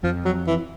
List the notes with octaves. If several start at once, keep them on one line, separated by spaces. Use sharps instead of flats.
F2 F3
F#3
E3